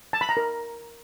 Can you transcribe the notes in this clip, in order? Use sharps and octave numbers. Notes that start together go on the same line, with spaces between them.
A5
B5
A#5
A#4